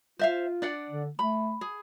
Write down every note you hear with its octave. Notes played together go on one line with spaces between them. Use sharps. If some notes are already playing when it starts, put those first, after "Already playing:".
F4 C5 E5 F5
D4 D5 F#5
D3
A3 B5
G#4